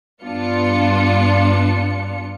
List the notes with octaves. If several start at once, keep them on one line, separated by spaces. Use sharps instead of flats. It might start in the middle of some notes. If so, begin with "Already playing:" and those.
G2 B3 D4 F4 C#7